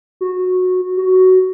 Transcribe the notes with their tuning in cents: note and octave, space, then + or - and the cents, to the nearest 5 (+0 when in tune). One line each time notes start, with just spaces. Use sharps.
F#4 -15
F#4 +10